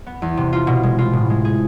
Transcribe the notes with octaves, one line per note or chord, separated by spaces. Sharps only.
B3
E2
C3
F4
B2
G#3
F4
A2
G#3
G#4